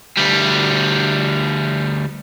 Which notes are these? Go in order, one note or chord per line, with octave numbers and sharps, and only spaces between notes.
D2 G3